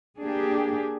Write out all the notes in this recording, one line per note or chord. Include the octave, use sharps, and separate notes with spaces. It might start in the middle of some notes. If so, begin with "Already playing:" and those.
A#3 D4 G4 G#4